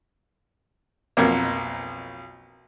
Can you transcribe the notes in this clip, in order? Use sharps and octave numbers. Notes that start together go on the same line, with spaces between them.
B1 F2 A#3